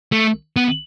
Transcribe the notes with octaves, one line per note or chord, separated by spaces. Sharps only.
A3
B3